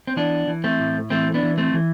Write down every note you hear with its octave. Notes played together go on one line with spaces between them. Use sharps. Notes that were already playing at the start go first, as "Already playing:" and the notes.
C4
E3 B3 D4
E3
A3 C4
A2
E3 A3 C4
B3 D4
E3
A3 C4
E3